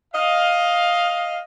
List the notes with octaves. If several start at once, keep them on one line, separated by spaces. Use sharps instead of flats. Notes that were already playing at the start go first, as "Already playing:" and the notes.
D#5 F5